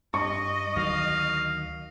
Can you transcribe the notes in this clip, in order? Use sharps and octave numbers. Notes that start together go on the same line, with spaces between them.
G2 D#5 C#6
D2 D#3 F#3 F5